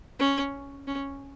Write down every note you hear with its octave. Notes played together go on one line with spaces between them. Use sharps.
C#4
C#4